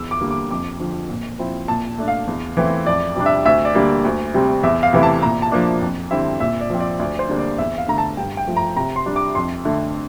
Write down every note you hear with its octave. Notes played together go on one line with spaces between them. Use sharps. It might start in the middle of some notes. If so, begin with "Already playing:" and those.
Already playing: E2 E6
D6
D3 G3 A#3
D6
F2 D6
D3 F3
A#2
F3 C4 E4
A#2 A5
A3 D4
F5
E2
E3 A3 C4 E4
F2 D5
C3 G3 D4
E5
D2 E5
D5
D3 G3 A#3
D2
C3 G3 C4
E2 E5
F5
C3 E3 A3 E4
A5
A#2 A#5
A5
F3 A#3 D4
F2
D3 G3 C4 E4 E5
A#2 E5
D5
F3 C4
D5
D2 D5
C5
D3 G3 A#3 D4
D5
E2 E5
F5
D3 A3 A#5
A5
G2 G5
G5
F3 A3
A#5
C3 A#5
C6
G3 D4
D6
F2 C6
D3 A3